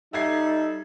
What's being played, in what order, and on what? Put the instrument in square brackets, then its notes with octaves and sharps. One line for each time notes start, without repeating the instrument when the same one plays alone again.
[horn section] G3 A4 [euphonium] D#4 [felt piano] E5 G#6 C7